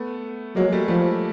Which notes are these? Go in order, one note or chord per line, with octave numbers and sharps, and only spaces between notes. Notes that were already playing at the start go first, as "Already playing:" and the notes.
Already playing: A3 B3
F#3 G#3 A#3
G3 A3
F3 G3 A3